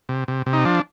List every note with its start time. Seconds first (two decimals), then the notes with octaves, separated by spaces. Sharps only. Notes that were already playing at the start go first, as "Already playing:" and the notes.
0.09 C3
0.28 C3
0.46 C3
0.53 D#4
0.65 F3 D4